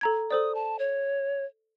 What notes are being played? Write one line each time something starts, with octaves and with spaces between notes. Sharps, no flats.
A4 A#5 G#6
A4 C5 D5 D#6
A5
C#5